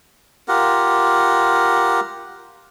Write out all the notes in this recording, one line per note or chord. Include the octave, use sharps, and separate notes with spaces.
F4 G4 A#4 F#5